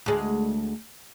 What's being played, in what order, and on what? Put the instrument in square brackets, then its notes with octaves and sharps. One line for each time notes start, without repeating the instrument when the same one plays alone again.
[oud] D2 G#3